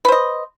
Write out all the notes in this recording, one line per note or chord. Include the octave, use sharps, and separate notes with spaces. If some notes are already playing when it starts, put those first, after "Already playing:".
B4 C5 D#5